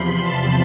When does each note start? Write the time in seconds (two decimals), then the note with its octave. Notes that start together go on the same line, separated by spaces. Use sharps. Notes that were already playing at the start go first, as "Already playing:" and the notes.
Already playing: E2 C3 F3 B5 C6
0.23 A5